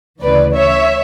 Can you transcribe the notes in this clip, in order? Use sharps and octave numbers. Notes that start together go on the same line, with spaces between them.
D2 C#3 E3 B4 D5
C#5 E5